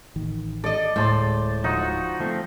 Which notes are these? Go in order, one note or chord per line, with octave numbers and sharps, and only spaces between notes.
A1 D#3
A4 D5 D#5
D1 A2 G#3 C5 A5 C6
F3 D#4 F#4
F3 A3 C4